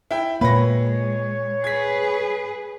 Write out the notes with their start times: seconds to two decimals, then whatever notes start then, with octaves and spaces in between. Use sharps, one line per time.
0.11 E4 G5
0.41 A#2 G#3 A#3 B4 C#5 A#6
1.64 G#4 B4 G#6 B6